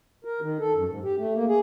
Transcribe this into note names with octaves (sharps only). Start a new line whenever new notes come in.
A#4
D#3
A4
F#2
G#2
G4
A3
A#3
G#4